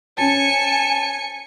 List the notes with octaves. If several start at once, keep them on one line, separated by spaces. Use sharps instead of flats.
C#4 G#5 A5 C#7